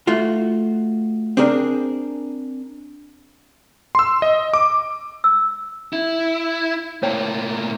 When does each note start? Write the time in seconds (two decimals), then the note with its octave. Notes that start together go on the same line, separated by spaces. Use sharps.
0.07 A3 F4 F#4
1.37 C4 D4 G#4 A#4
3.95 C6 E6
4.22 D#5
4.54 D6
5.24 E6
5.93 E4
7.03 A2 A#3 C#5 G5 A5